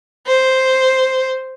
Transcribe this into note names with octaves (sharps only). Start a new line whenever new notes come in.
C5